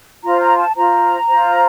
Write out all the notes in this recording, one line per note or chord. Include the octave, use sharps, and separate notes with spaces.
F4 C5 A#5
A#5
A5
F4 C5 A#5
F4 C5